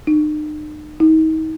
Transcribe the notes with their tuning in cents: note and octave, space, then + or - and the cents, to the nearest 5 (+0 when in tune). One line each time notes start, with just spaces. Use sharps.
D#4 -45
D#4 +35